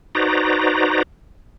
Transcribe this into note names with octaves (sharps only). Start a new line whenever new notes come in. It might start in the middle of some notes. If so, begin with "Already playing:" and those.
D#4 F#4 B4 C5 D5 A#5